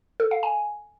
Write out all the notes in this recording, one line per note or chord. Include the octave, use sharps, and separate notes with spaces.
A4
F5
G#5